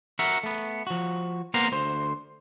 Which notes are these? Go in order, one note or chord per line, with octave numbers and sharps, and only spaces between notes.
F#4 A#4 E5 F#5
A3 B3
F3 F#4
A#3 B3 C5 F5 F#5 A#5
D2 C5